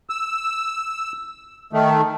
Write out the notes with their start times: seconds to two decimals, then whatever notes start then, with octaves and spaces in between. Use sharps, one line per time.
0.10 E6
1.73 D#3 A3